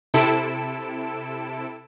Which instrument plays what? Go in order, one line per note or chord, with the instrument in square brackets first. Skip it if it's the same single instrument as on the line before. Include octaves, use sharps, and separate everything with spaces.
[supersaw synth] C3 E4 A4 D7 E7